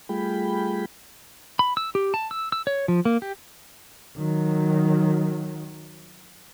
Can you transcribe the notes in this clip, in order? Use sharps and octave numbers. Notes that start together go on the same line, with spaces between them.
G3 A3 F4 G#4 G5 B5
B5
E6
G4
A5
E6
E6
C#5
F3
A#3
G4
D#3 F#3